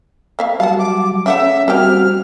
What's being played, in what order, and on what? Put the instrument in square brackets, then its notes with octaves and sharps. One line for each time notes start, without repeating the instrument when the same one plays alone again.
[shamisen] A#3 E5 F5
[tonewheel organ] F#3 G3 [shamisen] F5 F#5 [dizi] A5
[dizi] D6
[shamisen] C#3 A3 F#5 [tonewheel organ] C#4 [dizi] E5
[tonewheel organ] G3 C4 F#4 [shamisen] A#3 C#4 G4 [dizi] F6